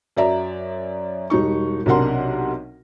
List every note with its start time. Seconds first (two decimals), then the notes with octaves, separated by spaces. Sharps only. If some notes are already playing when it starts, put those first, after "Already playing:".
0.17 F#2 F#3 D5 E5 A#5
1.30 E1 G3 D#4 C#6
1.86 B1 C3 D4 A#4 F#5 C6